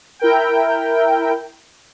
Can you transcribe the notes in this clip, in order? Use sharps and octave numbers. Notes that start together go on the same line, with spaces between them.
E4 A#4 G5